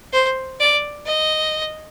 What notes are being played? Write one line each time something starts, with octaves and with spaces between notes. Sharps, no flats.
C5
D5
D#5